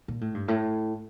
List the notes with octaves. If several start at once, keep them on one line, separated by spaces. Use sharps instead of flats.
A#2
A2
G2
A2